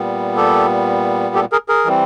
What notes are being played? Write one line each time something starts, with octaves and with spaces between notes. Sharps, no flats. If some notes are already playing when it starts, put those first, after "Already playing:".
Already playing: A#2 G3 B3
G4 A4
G4 A4
G#4 A#4
G#4 A#4
E3 G3 C4